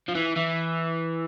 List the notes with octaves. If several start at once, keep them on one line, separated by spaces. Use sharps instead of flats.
F3
E3
E3